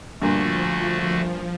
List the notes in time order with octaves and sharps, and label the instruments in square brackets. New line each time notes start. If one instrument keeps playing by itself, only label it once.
[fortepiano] G2 A#2 [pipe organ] D3 A3 F#4 [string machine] F3